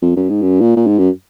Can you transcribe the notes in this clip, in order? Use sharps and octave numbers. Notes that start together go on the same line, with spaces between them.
F2
F#2
G#2
F#2
A#2
A#2
G#2
F#2